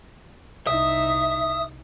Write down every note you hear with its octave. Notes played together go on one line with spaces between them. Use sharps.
C2 D#4 E5 D#6